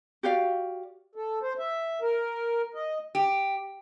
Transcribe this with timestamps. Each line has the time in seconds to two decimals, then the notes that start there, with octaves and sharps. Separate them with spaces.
0.23 F#4 G4 D5 F5
1.15 A4
1.42 C5
1.58 E5
2.02 A#4
2.74 D#5
3.15 G4